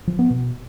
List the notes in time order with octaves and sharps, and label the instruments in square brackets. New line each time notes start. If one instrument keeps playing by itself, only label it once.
[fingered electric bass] F3
B3
B2